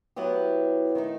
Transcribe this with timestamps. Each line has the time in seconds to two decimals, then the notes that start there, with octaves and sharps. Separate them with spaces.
0.16 F#3 B3 E4 G4
0.95 D#3 A3 D#4